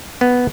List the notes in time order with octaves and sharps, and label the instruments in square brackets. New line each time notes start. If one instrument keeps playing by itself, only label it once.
[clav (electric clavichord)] B3